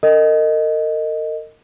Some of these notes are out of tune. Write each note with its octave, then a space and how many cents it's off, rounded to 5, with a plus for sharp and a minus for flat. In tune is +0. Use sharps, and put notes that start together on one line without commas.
A#4 -40 D#5 +0